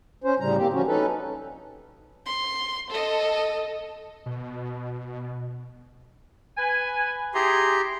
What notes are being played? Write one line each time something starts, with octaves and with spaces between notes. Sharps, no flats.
C#4 C5
D2 A2 C#3 G3 A#5
A#3 C4 G4
D2 F3 C#4 F#4
C#4 D#4 A4 B4
C6
A4 D#5
B2
B4 G#5
E4 G4 G#4 A#5 C6